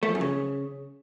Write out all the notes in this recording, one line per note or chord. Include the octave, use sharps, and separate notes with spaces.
A3
F3
F#2
C#3